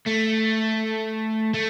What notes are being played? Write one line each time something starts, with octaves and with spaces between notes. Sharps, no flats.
A3
A3